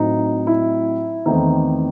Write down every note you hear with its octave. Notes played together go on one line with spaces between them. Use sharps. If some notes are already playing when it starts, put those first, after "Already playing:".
Already playing: A2 F#3 C4 D#4
E4
E2 D#3 A3 C4 D#4